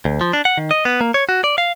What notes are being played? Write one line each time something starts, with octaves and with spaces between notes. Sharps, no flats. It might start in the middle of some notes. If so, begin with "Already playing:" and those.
D2
F3
D4
F#5
D#3
D#5
B3
A#3
C#5
F#4
D5
F5